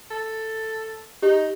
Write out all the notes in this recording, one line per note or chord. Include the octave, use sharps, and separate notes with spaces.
A4
D#4 G4